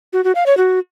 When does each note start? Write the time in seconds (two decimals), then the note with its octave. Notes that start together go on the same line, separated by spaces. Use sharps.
0.13 F#4
0.24 F#4
0.35 F5
0.46 C#5
0.57 F#4